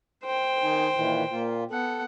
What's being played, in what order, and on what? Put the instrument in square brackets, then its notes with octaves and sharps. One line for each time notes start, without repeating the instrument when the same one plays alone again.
[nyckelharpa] C5 G5
[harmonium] D#3 D#4 G#5
A#2 D#3 E3
A#2 A#3 F4
[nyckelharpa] B3 F#5 [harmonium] A4